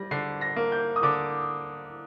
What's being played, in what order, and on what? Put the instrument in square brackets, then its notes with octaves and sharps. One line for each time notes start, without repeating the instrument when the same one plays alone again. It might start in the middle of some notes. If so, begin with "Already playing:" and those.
Already playing: [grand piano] G3 [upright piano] A#6
[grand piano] D3 [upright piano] C7
[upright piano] A#6
[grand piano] A#3
[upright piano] G6
D#6
[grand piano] D3 [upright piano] D6